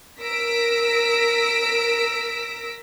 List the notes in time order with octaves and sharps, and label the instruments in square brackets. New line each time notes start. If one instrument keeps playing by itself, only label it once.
[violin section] A#4 E6 A#6 B6 D7